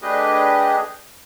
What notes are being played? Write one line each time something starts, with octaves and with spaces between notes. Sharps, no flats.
A3 D4 G4 G#4 B4 D#5